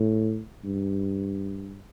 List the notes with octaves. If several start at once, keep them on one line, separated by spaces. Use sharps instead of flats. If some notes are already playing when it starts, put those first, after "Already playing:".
Already playing: A2
G2